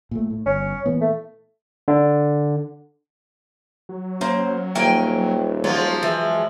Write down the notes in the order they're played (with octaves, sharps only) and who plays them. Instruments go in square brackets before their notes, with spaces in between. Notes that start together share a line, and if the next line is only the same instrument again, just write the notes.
[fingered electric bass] A#2 A3
A2
[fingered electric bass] G1 [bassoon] C#4
[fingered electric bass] A#2 E3 B3
[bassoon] A3
[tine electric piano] D3
[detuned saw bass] F#3
[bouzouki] A#3 C5 [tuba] C#4
[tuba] D#1 [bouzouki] A#3 G5 G#5
[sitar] F3 F#3 [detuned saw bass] G#3 [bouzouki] F4
[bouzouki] E3